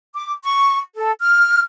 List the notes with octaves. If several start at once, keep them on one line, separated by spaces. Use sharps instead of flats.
D6
C#6
A4
F6